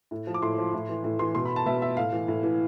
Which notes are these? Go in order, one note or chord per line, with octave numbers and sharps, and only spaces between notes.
A2
F3
D6
A2 C6
F3
A2
E3
A2
E3 C6
B2 C6
B5
A5
B2 E5
E5
A2 F5
E3
A2
E3